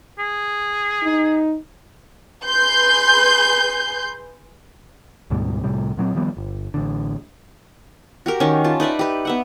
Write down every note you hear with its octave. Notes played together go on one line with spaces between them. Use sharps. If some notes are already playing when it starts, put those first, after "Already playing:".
G#4
D#4
G#4 B4 C6 G6
D2 G#2 B2 G3
C2 A2 C3 G3
A#2 F#3 B3 C4
D#3 F3 G3 B3
G1
A1 D3
F#4 G4 A#4
D#3 C#4
F4 A5
D#4 B4 D5 E5
G4 B4
B3 E5 F#5